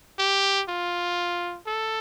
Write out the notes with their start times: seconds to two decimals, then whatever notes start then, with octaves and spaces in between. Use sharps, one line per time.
0.19 G4
0.68 F4
1.66 A4